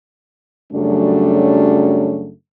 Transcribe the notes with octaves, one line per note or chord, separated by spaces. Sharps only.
F#2 C#3 F#3 G3 A3 D4